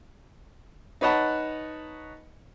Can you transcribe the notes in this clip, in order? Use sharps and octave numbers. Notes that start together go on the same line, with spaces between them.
D#4 B4 C#5 F#5 A5 B5